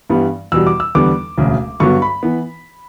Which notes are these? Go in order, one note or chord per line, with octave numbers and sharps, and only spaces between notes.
G2 E3 G3 B3
E2 B2 G3 E6
D6
E6
E2 D3 G3 B3 D6
E1 D2 C#3
G2 D3 F#3 B3 C#6
B5
E3 B3